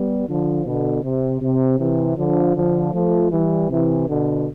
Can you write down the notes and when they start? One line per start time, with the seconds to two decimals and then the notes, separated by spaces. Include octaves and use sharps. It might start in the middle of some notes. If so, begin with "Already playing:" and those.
Already playing: G3 B3
0.28 D3 F3
0.65 B2 D3
1.03 C3
1.41 C3
1.79 C3 E3
2.17 D3 F3
2.55 D3 F3
2.93 F3 A3
3.31 E3 G3
3.69 C3 E3
4.08 B2 D3